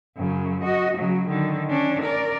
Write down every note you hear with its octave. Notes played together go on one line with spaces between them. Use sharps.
F#2 C#3
F#4 D#5
C#3 F#3
D3 D#3
C#4 D4
A#4 D5